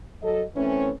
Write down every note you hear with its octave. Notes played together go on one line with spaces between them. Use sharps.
F#3 A4 D#5
E3 A3 C4 C#4